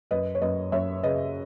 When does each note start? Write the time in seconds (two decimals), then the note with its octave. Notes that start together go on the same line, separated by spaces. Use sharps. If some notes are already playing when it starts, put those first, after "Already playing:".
0.11 F#2 B4 D#5
0.35 C#5
0.42 F#2 B4 D#5
0.72 F#2 C#5 E5
1.03 C#3 B4 D#5